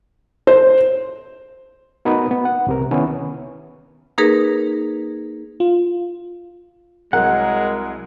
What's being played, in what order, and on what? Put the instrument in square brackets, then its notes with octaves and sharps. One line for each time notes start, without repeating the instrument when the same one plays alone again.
[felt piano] C5
[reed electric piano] B3 D#4 F#4 A#4 B4
B3
F#5
C2 C3 A#4
D#3 B3 C#4 E4
[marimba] A#3 D#4 G#4 A#4 B4
[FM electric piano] F4
[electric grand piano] C2 F#3 [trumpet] G#3 [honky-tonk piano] G#4 A#4 [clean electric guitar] F#5